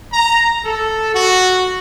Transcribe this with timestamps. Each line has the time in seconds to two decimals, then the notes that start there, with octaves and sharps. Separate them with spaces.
0.12 A#5
0.65 A4
1.15 F#4